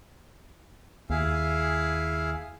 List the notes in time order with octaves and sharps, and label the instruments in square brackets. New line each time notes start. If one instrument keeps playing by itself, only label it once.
[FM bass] D#2 [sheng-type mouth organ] E4 G#4 F5